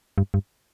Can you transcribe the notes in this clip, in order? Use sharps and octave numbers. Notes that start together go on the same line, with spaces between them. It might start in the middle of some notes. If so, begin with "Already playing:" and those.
G2
G2